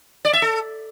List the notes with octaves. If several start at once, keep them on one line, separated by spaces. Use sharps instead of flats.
D5
E5
A4